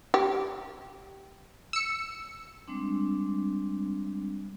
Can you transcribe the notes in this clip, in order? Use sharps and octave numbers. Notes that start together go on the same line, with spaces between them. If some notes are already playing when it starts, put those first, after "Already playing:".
G4
E6 C#7
G3 G#3 C4 D4